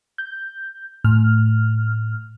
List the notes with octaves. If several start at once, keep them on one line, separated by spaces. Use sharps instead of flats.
G6
A2 F6